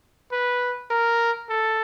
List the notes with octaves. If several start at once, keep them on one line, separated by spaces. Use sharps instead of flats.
B4
A#4
A4